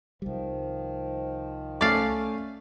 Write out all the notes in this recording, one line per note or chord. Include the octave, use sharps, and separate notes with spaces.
C2 D#3 F3 G3
A3 C#4 D5 F5